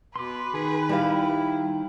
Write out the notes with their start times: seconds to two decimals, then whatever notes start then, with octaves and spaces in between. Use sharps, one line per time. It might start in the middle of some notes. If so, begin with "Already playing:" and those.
0.16 B2 B4 C6 D6
0.53 D#3 G#4
0.89 G3 E4 F5